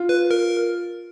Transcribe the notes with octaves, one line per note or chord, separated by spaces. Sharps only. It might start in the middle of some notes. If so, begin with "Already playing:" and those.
Already playing: F4
B4
A#4